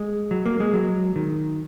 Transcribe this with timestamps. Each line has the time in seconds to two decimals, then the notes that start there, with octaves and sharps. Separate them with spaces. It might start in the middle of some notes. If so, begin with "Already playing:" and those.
Already playing: G#3
0.31 F#3
0.46 A#3
0.60 G#3
0.74 F#3
1.16 D#3